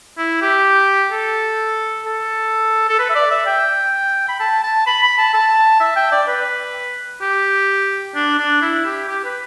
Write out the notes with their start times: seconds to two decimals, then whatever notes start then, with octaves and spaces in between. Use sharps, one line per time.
0.18 E4
0.42 G4
1.12 A4
2.06 A4
2.89 A4
2.99 B4
3.10 E5
3.15 D5
3.31 E5
3.47 G5
4.29 B5
4.40 A5
4.64 A5
4.87 B5
5.03 B5
5.18 A5
5.34 A5
5.80 E5
5.96 G5
6.12 D5
6.28 B4
7.21 G4
8.15 D4
8.38 D4
8.62 E4
8.86 G4
9.08 G4
9.24 B4